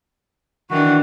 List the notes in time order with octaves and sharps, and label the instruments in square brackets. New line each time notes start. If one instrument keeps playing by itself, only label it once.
[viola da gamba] D#3 E3 D4 [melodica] F#4